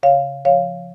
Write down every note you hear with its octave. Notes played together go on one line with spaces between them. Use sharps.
C#3 C#5 F5
F3 C#5 F5